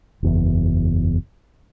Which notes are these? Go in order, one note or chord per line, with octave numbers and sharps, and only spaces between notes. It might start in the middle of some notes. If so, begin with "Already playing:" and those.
F#1 E2